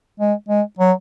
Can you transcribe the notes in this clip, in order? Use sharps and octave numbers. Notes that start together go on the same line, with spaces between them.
G#3
G#3
F#3